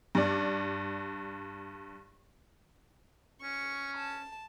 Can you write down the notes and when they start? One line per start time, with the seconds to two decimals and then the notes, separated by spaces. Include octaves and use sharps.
0.15 G2 D5
3.42 C#4 C#6
3.97 A5